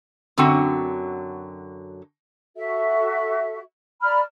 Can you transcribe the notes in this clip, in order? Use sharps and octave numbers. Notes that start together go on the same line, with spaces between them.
F#2 D3 F#3 C4 F#4 F#5
F#4 A4 E5
D5 A#5 B5 F6